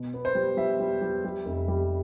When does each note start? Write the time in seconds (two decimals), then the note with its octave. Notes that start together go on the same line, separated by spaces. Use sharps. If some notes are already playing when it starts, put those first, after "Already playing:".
Already playing: B2
0.14 B3
0.25 C5
0.35 G3
0.57 G3 E5
0.80 G3
1.02 G3
1.24 G3
1.45 F1
1.68 G3